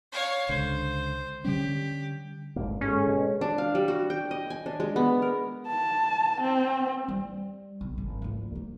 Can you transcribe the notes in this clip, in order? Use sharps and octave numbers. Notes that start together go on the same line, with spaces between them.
C#5 F5
C#2 D3 C5
D3 G3 C#4 G4
G1 G#2 A#3
G#3 C#4 A4
B2
D4
F5
G3
F#4
G5
D#5
G#5
D4
G#3
B3
A#4
A5
C4
G3
B1
G#1
D2 F3
A#3 D#4